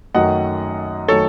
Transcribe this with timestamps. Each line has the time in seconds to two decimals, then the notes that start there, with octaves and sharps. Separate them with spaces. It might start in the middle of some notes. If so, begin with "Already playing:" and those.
0.14 F#2 D#3 F#3 A3 D#5 F#5
1.08 D#3 F#3 A3 A4 C#5